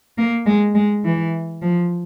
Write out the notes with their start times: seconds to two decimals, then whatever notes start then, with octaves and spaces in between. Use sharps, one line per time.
0.18 A#3
0.46 G#3
0.75 G#3
1.05 E3
1.62 F3